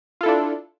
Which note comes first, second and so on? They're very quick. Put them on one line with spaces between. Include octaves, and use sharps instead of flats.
F4 A4 E4 D4